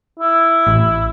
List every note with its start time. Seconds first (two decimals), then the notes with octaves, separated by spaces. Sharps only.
0.20 E4
0.67 A1